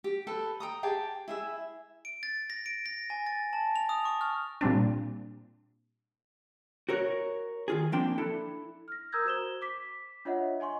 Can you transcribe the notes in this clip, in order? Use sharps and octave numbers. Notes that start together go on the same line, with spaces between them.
G4
A4 B4 G5
G5 A#5 D#6
G4 G#4 G5 A5
E4 G#4 E5
D7
A6
A#6
D7
A#6
G#5
A6
A5
F7
D#6
C#6
F6
A#2 G3 C4 D4
F#4 A#4 C#5
D#3 F4 G#4
F3 A#3 C4 D4 G5 C6
D4 E4 A4
F6 A#6
A#4 A#5 D#6 E6 G6 G#6
F#4 C5 E7 G7
D6 B6
D4 F4 C#5 D#5 E5 F#5
D#5 G#5 C6 C#6